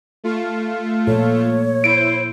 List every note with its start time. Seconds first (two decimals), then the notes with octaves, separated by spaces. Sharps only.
0.24 A3 F4
1.07 A#2 A4 C#5
1.84 E4 C5 D7